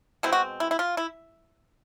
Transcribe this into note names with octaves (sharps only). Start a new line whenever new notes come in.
B2 G#3 C4 E4
F#4
E4
E4
F4
E4